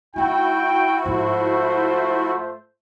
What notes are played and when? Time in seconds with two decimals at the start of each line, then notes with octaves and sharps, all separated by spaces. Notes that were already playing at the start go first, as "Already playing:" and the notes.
0.16 A3 D#4 E4 F#4 G5
1.05 G#2 F3 A3 F4 C5